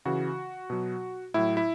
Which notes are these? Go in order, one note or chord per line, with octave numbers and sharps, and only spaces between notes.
C#3 E3 F#4
B2 F#3
A2 F#3 E4
E4